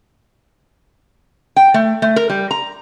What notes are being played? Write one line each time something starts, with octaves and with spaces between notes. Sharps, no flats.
G5
A3
A3
A#4
G3
A#5